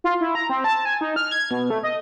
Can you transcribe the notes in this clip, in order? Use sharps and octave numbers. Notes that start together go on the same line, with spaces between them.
F4
E4
A#5
C4
A5
G#5
D#4
F6
G#6
B2
A3
D#5